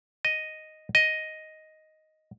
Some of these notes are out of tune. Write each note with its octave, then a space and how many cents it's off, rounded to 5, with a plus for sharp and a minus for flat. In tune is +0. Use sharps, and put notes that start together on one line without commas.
D#5 +0
D#5 +5